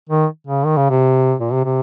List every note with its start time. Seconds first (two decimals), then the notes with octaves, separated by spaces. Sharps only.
0.09 D#3
0.47 C#3
0.66 D#3
0.77 C#3
0.90 C3
1.40 A#2
1.52 C3
1.65 C3